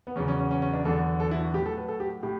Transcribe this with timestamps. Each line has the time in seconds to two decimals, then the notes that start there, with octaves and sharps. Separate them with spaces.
0.07 B3
0.16 E2 C#3 F#3 C#4
0.28 C#4
0.39 C#4
0.51 C#4
0.62 C#4
0.73 D4
0.85 E2 D3 F#3 A4
1.20 A4
1.31 E4
1.42 F#4
1.54 A2 F#3 G4
1.66 A4
1.77 B4
1.88 A4
2.00 G4
2.23 A2 G4